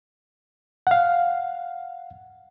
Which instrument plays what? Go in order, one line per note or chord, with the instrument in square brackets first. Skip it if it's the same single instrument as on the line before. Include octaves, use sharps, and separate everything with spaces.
[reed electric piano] F5 F#5